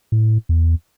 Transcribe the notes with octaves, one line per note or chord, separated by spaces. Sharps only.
A2
E2